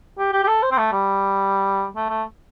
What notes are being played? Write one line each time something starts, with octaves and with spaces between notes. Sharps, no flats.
G4
G4
G4
A4
C5
C4
A3
G3
A3
A3